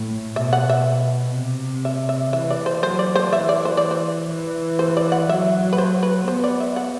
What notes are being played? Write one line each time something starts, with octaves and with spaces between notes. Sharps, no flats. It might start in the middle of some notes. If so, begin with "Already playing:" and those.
Already playing: A2
B2 E5
F#5
E5
C3
E5
E5
E3 E5
D5
C5
F#3 C5
D5
C5
E3 E5
D5
C5
D5
C5
E3
C5
D5
F#5
F#3 E5
B4
C5
B4
B3 C5
D5
E5
F#5